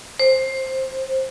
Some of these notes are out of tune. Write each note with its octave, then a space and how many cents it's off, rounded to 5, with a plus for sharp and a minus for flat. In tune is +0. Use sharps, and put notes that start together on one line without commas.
C5 +15